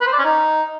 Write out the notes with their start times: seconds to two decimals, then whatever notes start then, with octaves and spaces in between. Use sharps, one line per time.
0.01 B4
0.07 C5
0.13 D5
0.18 C#4
0.24 D#4